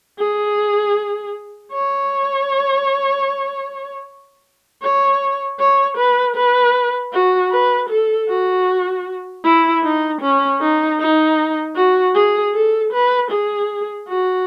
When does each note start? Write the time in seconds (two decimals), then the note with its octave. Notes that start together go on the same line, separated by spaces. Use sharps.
0.19 G#4
1.73 C#5
4.82 C#5
5.59 C#5
5.97 B4
6.36 B4
7.13 F#4
7.52 B4
7.90 A4
8.29 F#4
9.44 E4
9.83 D#4
10.22 C#4
10.61 D#4
11.00 D#4
11.76 F#4
12.15 G#4
12.54 A4
12.92 B4
13.31 G#4
14.09 F#4